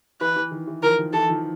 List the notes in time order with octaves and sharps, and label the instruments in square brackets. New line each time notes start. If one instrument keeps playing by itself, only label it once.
[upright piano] E3 [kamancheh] B4
[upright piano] E3
D#3
E3
[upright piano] D#3 F3 [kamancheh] A#4
[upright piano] D#3
[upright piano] E3 [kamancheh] A4
[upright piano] D#3 F3